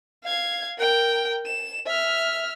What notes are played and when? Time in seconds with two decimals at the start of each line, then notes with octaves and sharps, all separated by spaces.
0.24 F5 G#6
0.78 A#4 G5
1.45 E7
1.86 E5 F6